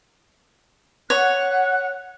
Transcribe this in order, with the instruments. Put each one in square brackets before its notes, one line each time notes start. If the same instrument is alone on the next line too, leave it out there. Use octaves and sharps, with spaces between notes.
[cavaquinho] C#5 [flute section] F#5 F#6